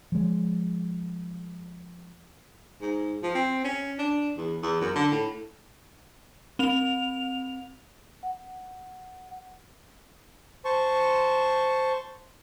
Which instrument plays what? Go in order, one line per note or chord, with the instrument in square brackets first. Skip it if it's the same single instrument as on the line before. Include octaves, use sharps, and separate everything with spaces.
[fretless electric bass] F3 G#3
[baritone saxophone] G#2
F3
C4
C#4
D4
E2
E2
F#2
D3
A2
[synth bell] C4 F7
[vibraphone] F#5
[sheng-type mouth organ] C5 A5 C#6